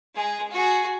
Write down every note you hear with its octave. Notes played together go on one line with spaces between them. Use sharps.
G#3 G#4
F#4 G#4